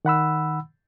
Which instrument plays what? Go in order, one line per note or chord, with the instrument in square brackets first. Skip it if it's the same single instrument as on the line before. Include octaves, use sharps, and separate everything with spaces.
[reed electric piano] D#3 F#5 B5 E6